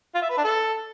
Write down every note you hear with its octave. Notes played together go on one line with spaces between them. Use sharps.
F4
E5
B4
D4
A4